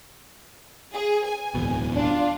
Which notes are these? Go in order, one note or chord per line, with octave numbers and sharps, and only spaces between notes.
G#4
G#5
D1 E2 B2
D4 F4